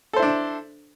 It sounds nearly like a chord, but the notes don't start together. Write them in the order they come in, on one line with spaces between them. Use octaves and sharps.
A4 C5 E4 D4